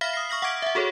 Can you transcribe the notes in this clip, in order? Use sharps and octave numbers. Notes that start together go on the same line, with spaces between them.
E5 F5 B5 F6 A#6 B6
D#6 C7
C#6 F6 A#6 F#7
F#5 C#6 D6 G#6 D7
E5 F#5
F#4 G#4 A4 C#5